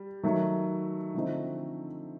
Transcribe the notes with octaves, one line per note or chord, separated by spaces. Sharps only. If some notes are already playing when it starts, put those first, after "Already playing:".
Already playing: G3
D#3 F#3 A3
D3 F3 A3 C4 D#4